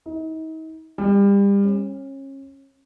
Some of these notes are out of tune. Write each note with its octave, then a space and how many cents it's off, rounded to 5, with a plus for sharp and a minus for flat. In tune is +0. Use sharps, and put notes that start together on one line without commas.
D#4 +40
G3 +30
C#4 -30